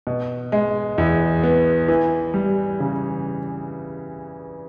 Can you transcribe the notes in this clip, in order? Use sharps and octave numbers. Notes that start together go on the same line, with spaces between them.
B2
G#3
E2
B3
E3
G3
C#3